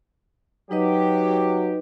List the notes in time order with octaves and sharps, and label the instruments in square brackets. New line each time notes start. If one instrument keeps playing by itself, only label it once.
[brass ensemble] F#3 G4 [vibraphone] D#4 B4 D#5